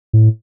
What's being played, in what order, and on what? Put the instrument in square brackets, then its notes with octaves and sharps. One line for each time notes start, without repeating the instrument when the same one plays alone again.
[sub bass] A2